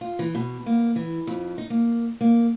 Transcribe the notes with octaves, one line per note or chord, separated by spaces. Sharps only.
F4
E3
B2
A#3
E3
F2
D#4
A#3
A#3